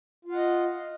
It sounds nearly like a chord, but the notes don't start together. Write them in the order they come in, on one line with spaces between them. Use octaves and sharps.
F4 F5 F#5 D#5